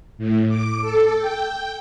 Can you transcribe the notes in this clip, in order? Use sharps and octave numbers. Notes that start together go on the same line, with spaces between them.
A2
D6
A4
G5